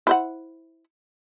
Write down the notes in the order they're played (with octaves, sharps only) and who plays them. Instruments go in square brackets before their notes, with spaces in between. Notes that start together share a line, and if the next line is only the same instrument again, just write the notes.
[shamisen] E4 C5 F#5